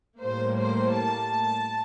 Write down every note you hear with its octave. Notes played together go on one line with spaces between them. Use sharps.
A2 G3 A#3 C5
C5
A5